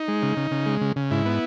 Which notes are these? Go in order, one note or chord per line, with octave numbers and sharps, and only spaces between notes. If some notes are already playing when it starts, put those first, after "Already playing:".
Already playing: D#4
G#3
C#3
C#3
C#3
G#3
C#3
C#3
G#2 E4
B3